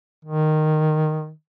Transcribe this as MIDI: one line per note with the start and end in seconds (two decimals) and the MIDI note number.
0.25 1.32 51